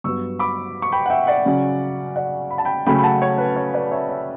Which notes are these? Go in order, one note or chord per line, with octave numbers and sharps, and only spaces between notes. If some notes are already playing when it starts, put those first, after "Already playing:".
G2 F#3 B3 C#6 E6
B5 D6
C#6
G5 B5
F#5
E5 G5
D5 F#5
C#3 F#3 C#4
D5 F#5
B5
A5
G5 B5
C#3 F#3 A3 C#4 G5 B5
B5
F#5 A5
C#5
B4
C#5
B4 D5
C#5 E5
C#5 E5